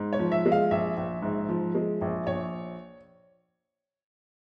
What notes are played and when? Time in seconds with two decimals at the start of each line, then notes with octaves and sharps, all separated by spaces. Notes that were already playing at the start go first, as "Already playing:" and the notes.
Already playing: G#2
0.13 C#5
0.19 F3
0.32 E5
0.46 G#3
0.52 F5
0.71 A#1 E5
0.97 A#1
1.22 G#2
1.49 F3
1.75 G#3
2.01 A#1
2.27 A#1 C#5